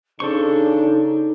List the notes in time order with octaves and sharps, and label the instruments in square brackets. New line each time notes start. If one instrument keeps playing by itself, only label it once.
[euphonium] C#3 [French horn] D4 [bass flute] D#4 [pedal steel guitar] A4 C5 C#6